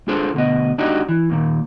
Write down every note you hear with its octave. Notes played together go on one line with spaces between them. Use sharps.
D4 F4 G#4 A4 C5
D2 B2 D#5
D4 D#4 F#4 G4 D5 D#5
E3
D#2 A#2 D#3